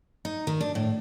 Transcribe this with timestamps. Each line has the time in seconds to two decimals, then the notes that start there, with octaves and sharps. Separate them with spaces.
0.25 D#4
0.47 D#3
0.61 D4
0.75 A2